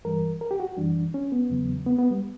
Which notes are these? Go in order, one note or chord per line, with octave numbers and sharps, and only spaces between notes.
G2 E3 G3 A#4
A#4
G4
F#4
F#2 E3 G3 D4
C#4
B3
E2 C#3 F#3
B3
B3
G3